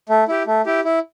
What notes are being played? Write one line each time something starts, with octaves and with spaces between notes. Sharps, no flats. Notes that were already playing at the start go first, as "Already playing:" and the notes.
A3
E4 G4
A3
E4 G4
E4